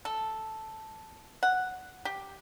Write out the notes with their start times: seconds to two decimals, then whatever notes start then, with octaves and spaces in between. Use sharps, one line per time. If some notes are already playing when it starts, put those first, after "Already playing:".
0.05 A4
1.43 F#5
2.05 G4